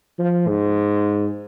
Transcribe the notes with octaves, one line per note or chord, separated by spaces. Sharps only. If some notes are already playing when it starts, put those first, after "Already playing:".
F3
G#2